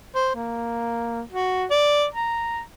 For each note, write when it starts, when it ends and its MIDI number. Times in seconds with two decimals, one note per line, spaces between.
0.15 0.31 72
0.36 1.21 58
1.33 1.65 66
1.71 2.06 74
2.14 2.60 82